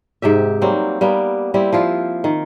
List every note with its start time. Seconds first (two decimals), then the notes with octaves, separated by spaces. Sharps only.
0.22 G#2 C3 G4 E5
0.62 F#3 G3 A#3 C4
1.01 G3 A#3 B3
1.54 G3 C4 E4
1.73 F3 E4 F4
2.24 D#3